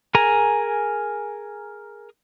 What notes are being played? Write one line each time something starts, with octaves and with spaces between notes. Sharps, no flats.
G#4 A#4 G#5 A#5